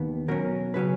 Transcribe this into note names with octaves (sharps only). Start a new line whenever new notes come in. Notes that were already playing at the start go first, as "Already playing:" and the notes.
Already playing: D#2 D#3 B3
B2 F#3 C#4 A#4
C#3 F#3 C#4 B4